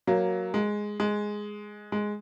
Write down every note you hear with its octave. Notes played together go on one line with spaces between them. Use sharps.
F#3 A#3
G#3
G#3
G#3